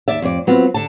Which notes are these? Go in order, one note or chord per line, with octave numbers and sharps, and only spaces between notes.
D#2 D5 E5
F2 D5
F#3 B3 C4 F4 B4
D3 A5